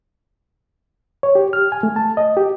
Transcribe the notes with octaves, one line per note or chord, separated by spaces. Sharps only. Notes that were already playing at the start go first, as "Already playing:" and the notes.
C#5
G4
F6
G#5
A3
A5
D#5
G4